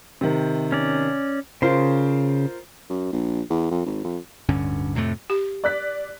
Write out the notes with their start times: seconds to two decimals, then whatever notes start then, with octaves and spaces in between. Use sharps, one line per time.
0.21 C3 D#3
0.72 C#4 D5
1.62 C#3 F4 A#4 C5 C6
2.90 F#2
3.13 A#1
3.50 E2
3.71 F2
3.86 G#1
4.04 F2
4.49 D1 G2 D3 C#4
4.95 F2 A2 C3 A3
5.30 G4
5.64 D5 F#6 B6